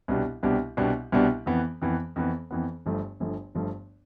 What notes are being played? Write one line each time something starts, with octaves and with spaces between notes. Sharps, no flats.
C2 B2 B3 D4 G4
C2 B2 B3 D4 G4
C2 B2 B3 D4 G4
C2 B2 B3 D4 G4
F2 E3 B3
F2 E3 B3
F2 E3 B3
F2 E3 B3
G1 G2 F3 A3
G1 G2 F3 A3
G1 G2 F3 A3